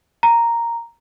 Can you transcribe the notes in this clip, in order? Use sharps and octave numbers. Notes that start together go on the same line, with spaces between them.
A#5